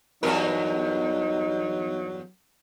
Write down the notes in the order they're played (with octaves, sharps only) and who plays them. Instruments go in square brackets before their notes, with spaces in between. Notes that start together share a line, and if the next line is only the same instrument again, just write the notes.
[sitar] E2 G2 A#4 [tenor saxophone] F#3 [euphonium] D#4